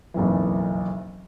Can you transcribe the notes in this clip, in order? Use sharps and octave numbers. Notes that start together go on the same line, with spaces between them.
F#1 B1 F2 E3